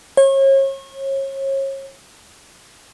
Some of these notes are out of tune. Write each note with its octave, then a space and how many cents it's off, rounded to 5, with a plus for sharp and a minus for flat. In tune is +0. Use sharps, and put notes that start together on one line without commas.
C#5 -35